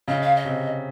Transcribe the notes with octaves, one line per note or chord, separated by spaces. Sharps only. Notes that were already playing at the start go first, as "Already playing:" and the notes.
C#3 D#5
F5
D#5
C3